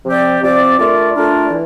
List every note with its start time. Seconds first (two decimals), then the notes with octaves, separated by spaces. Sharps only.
0.05 C3 F3 C4 G4 D5
0.41 C3 F3 C4 G4 D5
0.77 A3 D4 F4 A#4 D5
1.13 A3 D4 F4 A#4 D5
1.49 E3